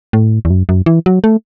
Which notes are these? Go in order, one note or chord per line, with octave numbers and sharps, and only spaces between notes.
A2
E2
F#2
F#2
E3
F#3
A3